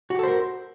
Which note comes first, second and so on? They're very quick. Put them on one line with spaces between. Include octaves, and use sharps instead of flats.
F#4 G4 A4 C5 A#4